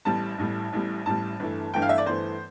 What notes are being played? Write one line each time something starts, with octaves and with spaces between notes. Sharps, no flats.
A1 A2 G3 A5
A1 A2 G3
A1 A2 G3
A1 A2 G3 A5
G1 G2 E3 A3
G1 G2 E3 A3 G5
F5
E5
D5
G1 G2 E3 A3 C5